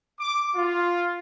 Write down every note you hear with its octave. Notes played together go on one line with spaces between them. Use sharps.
D6
F4